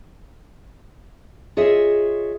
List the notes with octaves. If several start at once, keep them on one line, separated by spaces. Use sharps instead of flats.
F4 G#4 C#5 D#5 E5